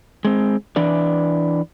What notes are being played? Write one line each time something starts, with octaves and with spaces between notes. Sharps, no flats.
G#3 C4
E3 D4 B4 D5